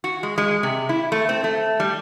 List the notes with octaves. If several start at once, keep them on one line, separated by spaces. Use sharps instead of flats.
F#4
G#3
G#3
C3
E4
A3
C4
A3
G3